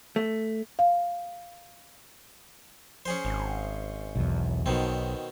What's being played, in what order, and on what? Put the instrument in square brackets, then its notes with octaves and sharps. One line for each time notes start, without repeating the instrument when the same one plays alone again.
[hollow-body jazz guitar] A3
[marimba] F5
[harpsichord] C#4 G#4 C5
[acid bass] G#1
[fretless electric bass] B1 E2
[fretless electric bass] B1 [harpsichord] B2 D#3 C4